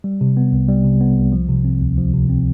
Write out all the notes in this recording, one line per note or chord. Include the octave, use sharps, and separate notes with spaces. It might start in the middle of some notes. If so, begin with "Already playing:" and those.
G3
C3
B3
C2
G3
C3
B3
C2
F3
C3
C4
D2
F3
C3
C4